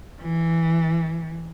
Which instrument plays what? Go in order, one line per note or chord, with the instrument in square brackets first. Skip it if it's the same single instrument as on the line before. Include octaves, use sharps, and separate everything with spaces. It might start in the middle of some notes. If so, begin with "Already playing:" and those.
[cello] E3